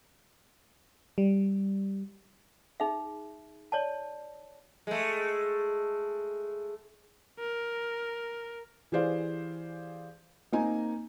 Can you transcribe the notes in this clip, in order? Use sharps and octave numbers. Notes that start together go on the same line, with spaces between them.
G3
D#4 G#4 E5
C#5 D5 A5
G#3 A3
A#4
E3 G4 G#4 C5 D5 F5
A#3 C4 D#4 G#5 A#5